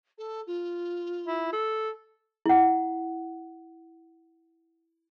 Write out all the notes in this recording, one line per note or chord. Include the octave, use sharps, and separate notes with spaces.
A4
F4
E4
A4
E4 F#5